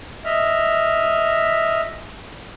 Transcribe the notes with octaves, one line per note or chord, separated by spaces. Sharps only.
D#5 E5 F6